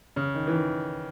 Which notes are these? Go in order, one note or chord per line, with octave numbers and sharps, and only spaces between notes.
C#3
D#3
E3
D#3